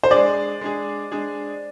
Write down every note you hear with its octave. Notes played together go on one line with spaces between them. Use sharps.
C5
G#3 D4 G#4 D5
G#3 D4 G#4
G#3 D4 G#4